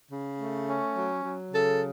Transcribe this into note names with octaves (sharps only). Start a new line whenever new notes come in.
C#3
A3
C#4
F#3
F#3
C#3 A4